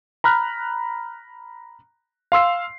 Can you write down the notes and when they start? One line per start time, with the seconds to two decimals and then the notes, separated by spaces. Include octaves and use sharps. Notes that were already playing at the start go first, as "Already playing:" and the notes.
0.24 A#5 B5 F6 F#6
2.32 F5 C6 E6 C7